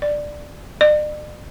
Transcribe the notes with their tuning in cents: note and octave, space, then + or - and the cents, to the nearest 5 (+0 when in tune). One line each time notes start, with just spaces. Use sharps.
D5 +5
D5 +40